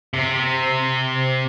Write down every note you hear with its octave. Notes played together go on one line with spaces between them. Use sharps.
C3